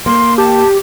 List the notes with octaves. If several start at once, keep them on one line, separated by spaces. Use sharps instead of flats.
A#3 C6
G4 A5